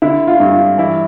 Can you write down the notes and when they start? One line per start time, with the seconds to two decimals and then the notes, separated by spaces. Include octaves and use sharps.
0.02 D3 E4
0.27 F4
0.40 G2
0.53 F4
0.78 E3 E4